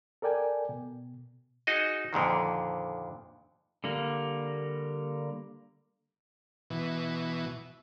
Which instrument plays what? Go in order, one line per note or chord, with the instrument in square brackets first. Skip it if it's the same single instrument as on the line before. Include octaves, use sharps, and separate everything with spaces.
[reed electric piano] A4 A#4 D5 G5 G#5
B2
[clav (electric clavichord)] D#4 F#4 G#4 D#5
F2 A#2 D3 D#3
[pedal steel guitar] D3 G3 A#3
[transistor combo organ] B2 E3